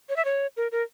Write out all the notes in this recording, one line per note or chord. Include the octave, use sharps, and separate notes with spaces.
C#5
E5
C#5
A#4
A#4